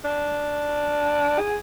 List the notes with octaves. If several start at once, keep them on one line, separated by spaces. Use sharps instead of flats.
D4
G#4